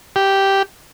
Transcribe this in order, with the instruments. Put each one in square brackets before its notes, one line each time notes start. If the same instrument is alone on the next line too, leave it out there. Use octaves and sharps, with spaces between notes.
[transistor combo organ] G4